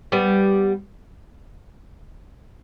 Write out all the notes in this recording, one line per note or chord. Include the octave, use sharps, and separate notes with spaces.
G3 B3